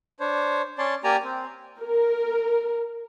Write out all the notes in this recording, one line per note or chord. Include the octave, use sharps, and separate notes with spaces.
D4 C5 C#5
C#4 C#5 D5 A5 C6
A#3 G4 D5 G#5 A#5
C4
A#4